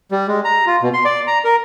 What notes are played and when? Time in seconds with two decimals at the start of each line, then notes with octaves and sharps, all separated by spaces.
0.11 G3
0.28 G#3
0.45 A#5
0.66 F4
0.82 B2
0.93 C6
1.05 D5
1.27 A#5
1.44 A#4